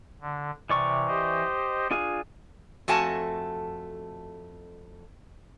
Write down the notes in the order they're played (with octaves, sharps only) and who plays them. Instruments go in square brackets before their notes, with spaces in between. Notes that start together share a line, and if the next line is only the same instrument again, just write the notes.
[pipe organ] D3
[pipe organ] C3 [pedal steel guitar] E3 D5 C#6
[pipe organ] G4 C5 D#5
[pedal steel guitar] D4 F4 G#4
[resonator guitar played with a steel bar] F2 A3 F#4 G#5 A5